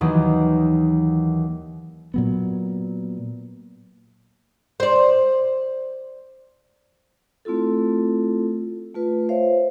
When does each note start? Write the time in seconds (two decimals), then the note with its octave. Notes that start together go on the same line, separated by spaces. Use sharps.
0.01 D#2 D#3 E3 F#3
2.14 A#2 F#3 B3
4.80 C5 D5
7.45 A3 C4 E4 F4 A4
8.94 A3 F4 B4
9.29 C5 C#5 E5 F5